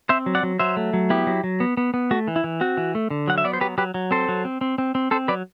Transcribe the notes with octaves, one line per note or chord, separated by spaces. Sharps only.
C4 C5 E5
F#3
D5 F#5
F#3
F#3 C5 E5
A3
F#3
B3 E4 G4
F#3
F#3
B3
B3
B3
A3 F#4
E3
E4
E3
C4 F#4
E3
A3
D3
F#3 F#5
E5
B3 D5
C5
F#3 G4 B4
F#3 G4 B4
F#3
C4 A4 C5
F#3
C4
C4
C4
C4
C4 A4 C5
F#3 B4 D5